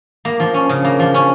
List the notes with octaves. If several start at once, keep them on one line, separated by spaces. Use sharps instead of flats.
A#3
F3
C#4
C#3
A#3
F3
C#4